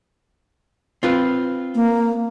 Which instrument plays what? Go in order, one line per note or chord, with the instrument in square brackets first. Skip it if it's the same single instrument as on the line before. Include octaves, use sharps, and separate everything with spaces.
[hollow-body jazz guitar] C4 F4 B4
[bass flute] A#3